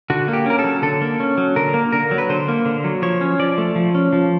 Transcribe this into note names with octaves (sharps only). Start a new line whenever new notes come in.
D3 F#4
A#3
G4
C#4 A#4
A4
F#3
D3 A4
A#3
C#4
F#3
D3 A#4
A#3
D3 A#4
F#3
B4
D3 C5
A#3
D3
F#3
F3 C#5
C#4
F3 D5
A3
F3
C#4
F3